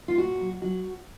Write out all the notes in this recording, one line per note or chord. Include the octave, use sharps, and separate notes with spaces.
F4
A#2 F#4
F#3
F#3 F#4